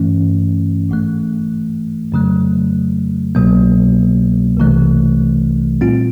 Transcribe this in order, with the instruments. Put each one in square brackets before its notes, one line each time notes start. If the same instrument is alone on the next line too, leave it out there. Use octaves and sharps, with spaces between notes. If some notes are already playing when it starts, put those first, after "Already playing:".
Already playing: [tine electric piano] G2 E3 A3 C#4
A#1 G#2 E3 A3
F2 C#3 F#3 A3
C2 B2 F#3 A#3
C2 C3 E3 A3
A#2 G3 C4 F4